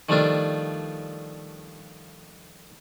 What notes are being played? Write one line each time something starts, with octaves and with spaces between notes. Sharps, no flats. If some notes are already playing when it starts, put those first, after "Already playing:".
D#3 F3 G3 A3 D4 F4